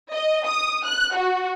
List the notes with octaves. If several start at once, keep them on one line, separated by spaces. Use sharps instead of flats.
D#5
D#6
F#6
F#4